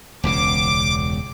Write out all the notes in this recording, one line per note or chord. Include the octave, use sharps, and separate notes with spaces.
E1 C#2 C#3 D6